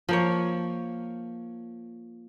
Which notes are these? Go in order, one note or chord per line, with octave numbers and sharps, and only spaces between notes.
F3 A#3 C#5